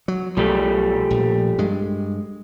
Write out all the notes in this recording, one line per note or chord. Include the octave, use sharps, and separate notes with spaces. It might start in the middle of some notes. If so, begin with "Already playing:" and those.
F#3
B1 F3 G3 A3
A#1
G2 G#3